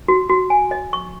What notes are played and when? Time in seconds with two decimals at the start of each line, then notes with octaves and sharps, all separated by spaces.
0.08 F#4
0.30 F#4
0.50 G#5
0.71 D#5
0.93 C#6